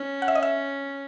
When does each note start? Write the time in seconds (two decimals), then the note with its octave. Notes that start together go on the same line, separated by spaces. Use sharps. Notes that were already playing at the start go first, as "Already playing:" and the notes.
Already playing: C#4
0.22 F#5
0.28 E5
0.35 D#5
0.43 E5